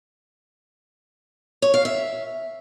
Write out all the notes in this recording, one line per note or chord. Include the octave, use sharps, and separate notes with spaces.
C#5
F5
E5